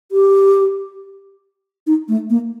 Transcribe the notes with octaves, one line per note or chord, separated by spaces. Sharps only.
G4
D#4
A3
A#3